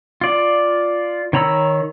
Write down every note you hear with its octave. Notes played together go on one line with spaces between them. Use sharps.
F4 D5
D#3 C#5 A#5 B5 E6